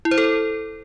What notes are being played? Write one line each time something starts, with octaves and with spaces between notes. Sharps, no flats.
E4
C5
A4